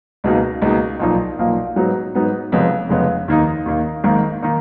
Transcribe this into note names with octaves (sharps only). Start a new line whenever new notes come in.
C#2 B2 A#3 D#4
C#2 B2 A#3 D#4
B1 A#2 F3 A#3 D#4
B1 A#2 F3 A#3 D#4
G#2 F#3 B3 D#4
G#2 F#3 B3 D#4
F1 F2 C#3 G#3 B3
F1 F2 C#3 G#3 B3
D#2 D#3 A#3 D#4
D#2 D#3 A#3 D#4
G#1 G#2 D#3 A#3 D#4
D#3 A#3 D#4